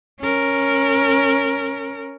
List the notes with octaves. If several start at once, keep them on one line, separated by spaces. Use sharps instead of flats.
C#4 A#4